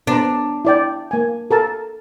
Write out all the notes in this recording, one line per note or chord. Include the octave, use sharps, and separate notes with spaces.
B3 D4 C5 A#5
E4 D5 G5
A#3 G#5
A4 A#4 A5